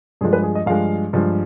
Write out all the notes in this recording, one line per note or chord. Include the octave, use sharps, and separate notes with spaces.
G2 F3 G#3 G#4
B4
G#4
D#5
G2 F3 G#3 F5
G2 F3 G#3